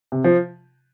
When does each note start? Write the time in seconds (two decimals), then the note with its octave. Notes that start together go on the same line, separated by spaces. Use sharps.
0.12 C3
0.24 F3